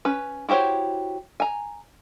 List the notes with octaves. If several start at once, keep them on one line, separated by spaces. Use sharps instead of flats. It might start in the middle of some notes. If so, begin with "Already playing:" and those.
C#4 B4
E4 F#4 G4 C5 C#5
G#5 A#5